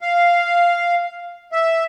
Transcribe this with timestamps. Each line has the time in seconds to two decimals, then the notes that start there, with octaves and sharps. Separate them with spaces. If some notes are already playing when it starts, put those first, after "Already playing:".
0.01 F5
1.52 E5